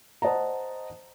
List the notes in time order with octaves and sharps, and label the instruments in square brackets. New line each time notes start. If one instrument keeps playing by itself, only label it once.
[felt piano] C5 D#5 F#5 A5 A#5